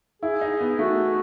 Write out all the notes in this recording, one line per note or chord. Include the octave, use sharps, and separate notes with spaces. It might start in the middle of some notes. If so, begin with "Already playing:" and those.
E4 G#4
D#4
B3
A3 F#4